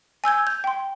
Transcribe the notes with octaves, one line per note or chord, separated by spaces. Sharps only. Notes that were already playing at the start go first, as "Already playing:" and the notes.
G#5 E6 G6 G#6
G6
G5 C6